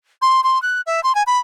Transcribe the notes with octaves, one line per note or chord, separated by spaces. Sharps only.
C6
C6
F#6
E5
C6
G#5
B5